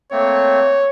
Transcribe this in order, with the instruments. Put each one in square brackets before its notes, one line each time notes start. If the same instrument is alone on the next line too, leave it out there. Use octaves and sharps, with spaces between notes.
[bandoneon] A3 A#3 C4 [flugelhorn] C#5